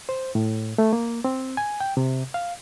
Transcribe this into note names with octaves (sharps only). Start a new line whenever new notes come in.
C5
A2
A3
A#3
C4
G#5
G5
C3
F5